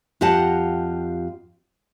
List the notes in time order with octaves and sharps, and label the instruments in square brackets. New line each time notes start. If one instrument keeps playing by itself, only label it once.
[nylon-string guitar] F2 F4 G4 D#5 F#5 A5